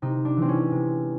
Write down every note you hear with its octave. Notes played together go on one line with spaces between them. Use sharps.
C3 D#4
D4
E3 G#3 C4
C#4
C3